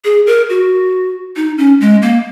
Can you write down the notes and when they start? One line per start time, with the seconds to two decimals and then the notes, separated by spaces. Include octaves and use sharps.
0.05 G#4
0.27 A#4
0.50 F#4
1.36 D#4
1.58 C#4
1.81 G#3
2.02 A#3